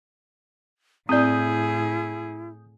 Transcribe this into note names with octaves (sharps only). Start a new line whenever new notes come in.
A2 C4 E4 G#4 D5 D#6 G6